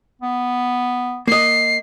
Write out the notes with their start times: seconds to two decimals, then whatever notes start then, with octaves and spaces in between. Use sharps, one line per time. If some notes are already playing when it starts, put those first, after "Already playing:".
0.22 B3
1.27 A#3 D#5 C7